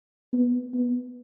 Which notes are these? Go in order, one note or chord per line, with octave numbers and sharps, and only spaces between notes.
B3
B3